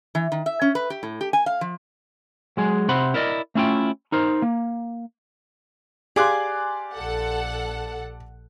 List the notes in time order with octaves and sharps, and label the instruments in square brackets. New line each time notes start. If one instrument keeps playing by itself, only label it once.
[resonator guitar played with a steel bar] E3
D#3
E5
C#4
B4
G4
A2
G4
G#5
F5
F3
[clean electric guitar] F#3 G#3 G#4
C3 C4 C5 F#5 B5
E4 A#4 D5 D#5
A3 C#4 E4 F4 G5
D#4 A#4 C5
A#3
[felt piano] G4 F5 C6 [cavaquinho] G#4 G#5 [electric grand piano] D5 D6 F#6
[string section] A#1 A4 F#5